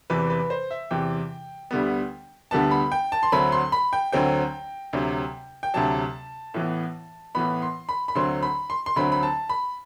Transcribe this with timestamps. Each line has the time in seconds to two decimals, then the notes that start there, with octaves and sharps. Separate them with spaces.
0.10 E2 C3 E3 B4
0.30 B4
0.50 C5
0.71 E5
0.91 E2 C3 E3 G5
1.71 D2 D3 G3 B3
2.51 D2 D3 G3 B3 A5
2.71 B5
2.92 G5
3.12 A5
3.23 C6
3.32 D2 D3 F#3 C4 B5
3.52 C6
3.72 B5
3.93 G5
4.12 D2 D3 F#3 C4 G5
4.93 D2 C3 F#3
5.63 G5
5.74 D2 C3 F#3 A5
6.54 A2 E3 B3
7.35 A2 E3 B3 B5
7.62 C6
7.89 B5
8.08 B5
8.15 D2 D3 F#3 C4 C6
8.43 B5
8.70 C6
8.86 C6
8.96 D2 D3 F#3 C4 B5
9.12 B5
9.23 A5
9.49 B5